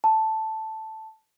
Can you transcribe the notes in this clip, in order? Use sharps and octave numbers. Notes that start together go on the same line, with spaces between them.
A5